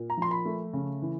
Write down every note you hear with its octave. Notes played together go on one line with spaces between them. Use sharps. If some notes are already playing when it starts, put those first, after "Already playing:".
Already playing: A#2
A#5
F3 C6
B5
A3
C#3
E3